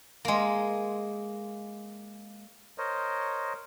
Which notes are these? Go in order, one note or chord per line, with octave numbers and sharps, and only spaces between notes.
G#3 A#3
A#4 C5 C#5 D#5